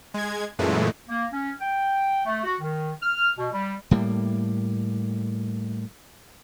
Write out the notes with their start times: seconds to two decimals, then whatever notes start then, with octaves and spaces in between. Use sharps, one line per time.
0.14 G#3 G#6
0.59 F#2 A#2 E3 G#3 A3
1.09 A#3
1.33 C#4
1.61 G5
2.26 A3
2.44 F#4
2.61 D#3
3.03 F6
3.38 B2
3.53 G3
3.91 A2 G3 A#3